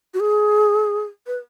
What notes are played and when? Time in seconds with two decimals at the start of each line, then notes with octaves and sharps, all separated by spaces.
0.14 F#4
0.20 G#4
1.27 B4